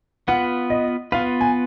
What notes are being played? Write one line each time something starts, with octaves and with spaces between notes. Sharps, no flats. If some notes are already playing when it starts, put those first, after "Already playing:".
B3 F4 B4 F#5
D#5
B3 F4 B4 F5
G#5